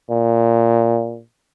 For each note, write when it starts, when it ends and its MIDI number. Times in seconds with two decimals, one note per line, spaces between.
0.10 1.21 46